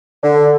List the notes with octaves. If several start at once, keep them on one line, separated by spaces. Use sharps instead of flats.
D3